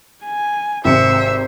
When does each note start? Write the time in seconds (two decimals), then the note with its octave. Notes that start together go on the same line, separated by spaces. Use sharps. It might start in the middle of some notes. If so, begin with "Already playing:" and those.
0.25 G#5
0.85 G#1 C3 C5 E5 C#7